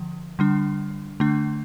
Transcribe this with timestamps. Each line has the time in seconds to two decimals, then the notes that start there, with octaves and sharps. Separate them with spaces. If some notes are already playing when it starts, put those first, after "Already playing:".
Already playing: D3 F3
0.39 D3 G3 D4
1.20 D3 A3 D4